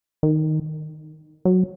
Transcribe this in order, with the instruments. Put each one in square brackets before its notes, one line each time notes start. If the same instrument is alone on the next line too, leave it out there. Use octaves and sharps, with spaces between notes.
[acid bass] D#3
F#3